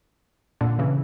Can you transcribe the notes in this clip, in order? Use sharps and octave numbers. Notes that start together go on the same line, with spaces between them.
A#2 D3
C#3 E3